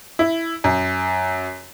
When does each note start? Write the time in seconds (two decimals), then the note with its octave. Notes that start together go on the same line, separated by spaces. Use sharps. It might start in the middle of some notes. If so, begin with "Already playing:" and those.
0.19 E4
0.64 F#2